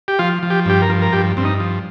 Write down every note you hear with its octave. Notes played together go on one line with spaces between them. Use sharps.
G4
F3 F4
F3
G4
G2 G4
A#4
F3
A#4
G2 G4
G2 C4
D#4
F3